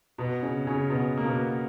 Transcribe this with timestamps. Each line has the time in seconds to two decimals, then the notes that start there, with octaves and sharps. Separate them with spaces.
0.18 B2 B3
0.43 C#3 C#4
0.67 C#3 C#4
0.90 B2 B3
1.17 A#3
1.26 B2 B3